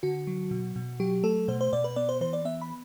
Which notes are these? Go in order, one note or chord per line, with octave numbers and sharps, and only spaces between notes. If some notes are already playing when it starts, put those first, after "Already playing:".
D3 F#4
F#3
B2
B2
F#3 G4
A3 A4
B2 C5
C5
B2 D5
B4
B3 D5
C5
E3 C5
D5
B3 E5
B5